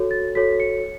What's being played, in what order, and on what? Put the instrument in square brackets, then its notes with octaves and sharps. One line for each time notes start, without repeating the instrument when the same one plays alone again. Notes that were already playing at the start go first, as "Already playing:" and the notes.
Already playing: [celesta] F#4 A4 C#5
A6
F#4 A4 C#5 B6
C#7